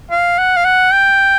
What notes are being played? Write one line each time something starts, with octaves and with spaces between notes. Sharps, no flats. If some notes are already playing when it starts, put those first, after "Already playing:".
F5
F#5
F5
F#5
G5